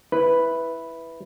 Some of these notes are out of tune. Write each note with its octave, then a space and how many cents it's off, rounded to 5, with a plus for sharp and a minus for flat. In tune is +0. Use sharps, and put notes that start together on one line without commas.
E4 +0 B4 +0